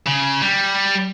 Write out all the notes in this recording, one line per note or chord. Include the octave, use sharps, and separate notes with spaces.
C#3
G3